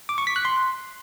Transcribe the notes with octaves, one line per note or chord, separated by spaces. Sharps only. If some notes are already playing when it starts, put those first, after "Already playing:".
D6
C#6
B6
F#6
C6